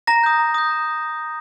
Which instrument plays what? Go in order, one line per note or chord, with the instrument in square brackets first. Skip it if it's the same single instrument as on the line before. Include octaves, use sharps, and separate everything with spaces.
[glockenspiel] A#5 A#6
D#6 G6
A#5
D#6 G6
A#5